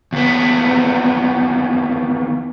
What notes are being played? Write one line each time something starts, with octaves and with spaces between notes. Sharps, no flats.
D#2 B3